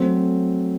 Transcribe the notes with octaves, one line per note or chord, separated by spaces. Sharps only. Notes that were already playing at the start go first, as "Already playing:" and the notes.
Already playing: F#3 A3 C4